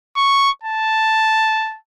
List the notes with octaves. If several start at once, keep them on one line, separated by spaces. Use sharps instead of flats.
C#6
A5